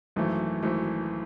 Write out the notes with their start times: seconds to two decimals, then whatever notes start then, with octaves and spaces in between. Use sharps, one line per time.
0.16 G#1 F#2 E3 A3
0.63 G#1 F#2 E3 A3